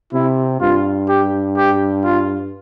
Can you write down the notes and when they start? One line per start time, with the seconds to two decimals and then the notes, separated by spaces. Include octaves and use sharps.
0.13 C3 E4
0.61 G2 F4
1.08 G4
1.57 G4
2.04 F4